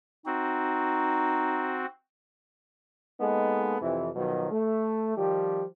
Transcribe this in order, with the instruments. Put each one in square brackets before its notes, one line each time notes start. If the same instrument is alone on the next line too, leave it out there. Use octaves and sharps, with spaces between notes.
[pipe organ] C4 F#4 [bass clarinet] D#4
[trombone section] G#3 A#3 B3 D#4 A4
F2 C3 E3
B2 D#3 F3 F#3
A3
D#3 F3 G3 G4